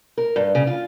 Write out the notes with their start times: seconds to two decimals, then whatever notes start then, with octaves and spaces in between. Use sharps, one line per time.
0.18 A#4
0.36 G2
0.55 C#3
0.67 F4